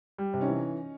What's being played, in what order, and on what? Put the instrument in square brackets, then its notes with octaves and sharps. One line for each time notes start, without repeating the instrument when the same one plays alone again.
[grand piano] G3
C3
[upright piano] C#4 D#4
[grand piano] E3